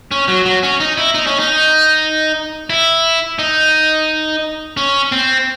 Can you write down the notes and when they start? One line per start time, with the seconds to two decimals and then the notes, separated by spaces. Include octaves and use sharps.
0.11 C#4
0.28 F#3
0.46 F#3
0.63 C#4
0.80 D#4
0.98 E4
1.15 D#4
1.27 C#4
1.39 D#4
2.70 E4
3.39 D#4
4.77 C#4
5.12 C4